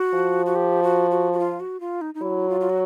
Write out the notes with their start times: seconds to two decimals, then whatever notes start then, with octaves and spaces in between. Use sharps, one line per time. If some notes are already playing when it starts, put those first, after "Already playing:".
Already playing: F#4
0.14 F3
0.46 F#4
0.55 G4
0.83 F#4
1.11 F#4
1.33 F#4
1.39 F4
1.60 F#4
1.80 F4
2.01 D#4
2.14 D#4
2.21 F#3 E4
2.49 F4
2.60 F4
2.70 F#4